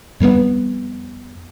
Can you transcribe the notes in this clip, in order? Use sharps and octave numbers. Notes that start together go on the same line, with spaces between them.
F2 G3 A3 B3